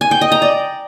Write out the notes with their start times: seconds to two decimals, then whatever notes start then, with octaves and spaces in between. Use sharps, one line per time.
0.01 G#5
0.11 G5
0.21 D#5
0.32 A#5
0.42 D5